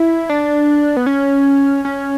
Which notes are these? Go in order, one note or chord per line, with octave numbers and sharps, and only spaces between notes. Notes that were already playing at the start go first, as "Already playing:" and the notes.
Already playing: E4
D4
B3
C#4
C#4